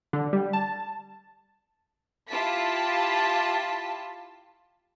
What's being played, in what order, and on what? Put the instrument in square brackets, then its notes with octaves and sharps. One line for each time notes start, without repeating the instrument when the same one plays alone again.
[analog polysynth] D3
G3
A5
[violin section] E4 F4 G4 A5 B6